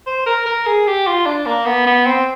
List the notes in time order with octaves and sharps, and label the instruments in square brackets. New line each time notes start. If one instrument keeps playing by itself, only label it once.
[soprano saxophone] C5
A#4
A#4
G#4
G4
F4
D4
A#3
B3
B3
C4